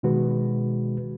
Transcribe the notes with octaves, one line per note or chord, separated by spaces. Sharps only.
B2 D#3 G#3 F#4 B4